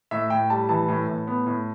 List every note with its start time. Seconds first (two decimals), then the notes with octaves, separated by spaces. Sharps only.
0.11 A2 E5
0.30 A2 G5
0.50 G3 A5
0.69 E3 A5
0.88 A2
1.08 A2
1.27 B3
1.46 A2